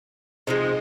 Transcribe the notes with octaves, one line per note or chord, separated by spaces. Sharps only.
C3 F3 G#3 C4 D#4